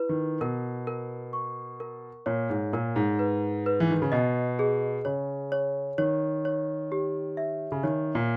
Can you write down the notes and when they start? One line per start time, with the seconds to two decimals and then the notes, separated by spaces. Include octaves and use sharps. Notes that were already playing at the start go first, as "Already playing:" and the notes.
Already playing: E4 B4
0.09 D#3
0.41 B2 A#4
0.87 A#4
1.33 C#6
1.80 A#4
2.26 A#2 C#5
2.50 G#2
2.73 A#2 A#4
2.96 G#2
3.19 B4
3.66 B4
3.80 E3
3.91 D#3
4.02 C#3
4.12 B2 D#5
4.59 G#4
5.05 C#3 C#5
5.52 C#5
5.98 D#3 C#5
6.45 C#5
6.92 G4
7.37 E5
7.72 C#3
7.83 D#3 C#5
8.15 A#2